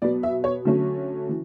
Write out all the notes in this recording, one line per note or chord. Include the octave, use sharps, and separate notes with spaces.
B2 F#3 B3 D5
E5
C#5
D3 F#3 A3 C#4
E3